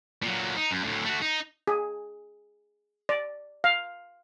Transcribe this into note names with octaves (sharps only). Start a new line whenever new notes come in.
A#2 F#3
D#4
F#2
D2 A2
A3 F#4
D#4
G#4
D5
F5